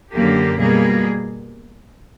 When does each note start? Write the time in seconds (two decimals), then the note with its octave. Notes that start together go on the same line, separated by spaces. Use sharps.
0.13 F#2 D3 F#3 A#3 G4
0.58 B2 G3 A#3 G#4